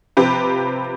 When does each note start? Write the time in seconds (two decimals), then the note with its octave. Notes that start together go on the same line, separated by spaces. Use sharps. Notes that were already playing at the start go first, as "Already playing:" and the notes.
0.17 C3 F3 C4 G4 B4